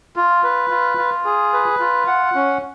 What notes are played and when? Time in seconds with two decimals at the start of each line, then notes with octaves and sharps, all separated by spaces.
0.16 F4
0.43 B4
0.70 F4
0.98 F4
1.25 G#4
1.53 B4
1.80 F4
2.07 F#5
2.35 C#4